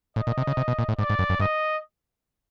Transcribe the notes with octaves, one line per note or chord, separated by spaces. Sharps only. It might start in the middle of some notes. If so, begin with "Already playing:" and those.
A2 D#5
A#2
C3
C#3
C3
B2
A#2
A2
G#2 D5
G#2
F#2
F#2
G2 D#5